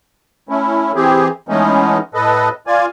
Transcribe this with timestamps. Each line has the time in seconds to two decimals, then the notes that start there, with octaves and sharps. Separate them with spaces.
0.49 A3 C#4 E4
0.95 E3 C4 G4 G#4
1.49 E3 G#3 A3 B3 C#4 D#4
2.14 A2 A4 B4 D#5
2.67 F4 D5 G#5